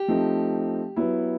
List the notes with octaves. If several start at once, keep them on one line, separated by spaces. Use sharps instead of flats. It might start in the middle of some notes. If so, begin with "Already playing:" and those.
Already playing: G4
F3 A3 C4 D#4
F#3 B3 E4